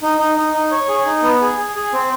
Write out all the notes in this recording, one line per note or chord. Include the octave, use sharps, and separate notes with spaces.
D#4
D#4
D#4
D#4
C#5
G#4
D#4
B3
G#4
G#4
G#4
C4